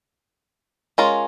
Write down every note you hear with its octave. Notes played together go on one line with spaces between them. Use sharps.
G#3 C#4 F4 A#4